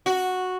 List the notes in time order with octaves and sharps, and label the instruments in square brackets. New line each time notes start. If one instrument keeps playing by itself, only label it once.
[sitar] F#4